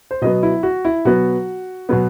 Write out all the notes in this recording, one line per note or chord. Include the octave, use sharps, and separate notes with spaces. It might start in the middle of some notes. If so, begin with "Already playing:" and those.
C5
B2 F#3 B3 D#5
E4
F#4
E4
B2 F#3 B3 F#4
B2 F#3 B3